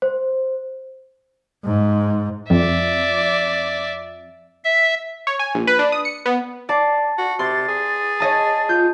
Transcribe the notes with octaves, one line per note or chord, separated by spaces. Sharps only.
C5
G#2
F2 D5 E5
E5
C#5
G#5
A#1
B4
D4
D#6
C#7
B3
D5 A5 C7
F#4
C3 C6 A6
G#4
C#5 D#5 A5
F4 G6